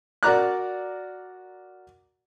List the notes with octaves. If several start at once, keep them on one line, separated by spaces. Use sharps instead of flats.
F#4 A#4 D5 A#5 D6 F#6